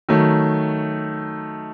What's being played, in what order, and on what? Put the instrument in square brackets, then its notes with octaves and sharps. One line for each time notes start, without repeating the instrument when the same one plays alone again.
[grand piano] D#3 F#3 A3